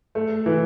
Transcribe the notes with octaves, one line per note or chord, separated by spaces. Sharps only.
A3
E3